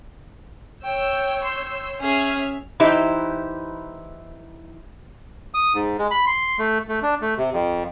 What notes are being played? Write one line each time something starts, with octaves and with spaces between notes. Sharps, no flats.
C#5 G5 E6 G6
C6
C#4 G#4 E5 F6
E3 D#4 E4 G4 C5
D#6
G#2
G#3
B5
C6
A3
A3
D4
A3
C3
F2